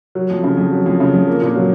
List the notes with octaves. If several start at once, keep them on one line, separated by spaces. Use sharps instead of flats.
F#3
F2
C#3
F2
F#3
F2
C#3
F2
A#3
A#2
F#3